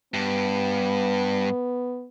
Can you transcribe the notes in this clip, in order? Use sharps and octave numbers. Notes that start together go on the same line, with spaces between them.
G2 B3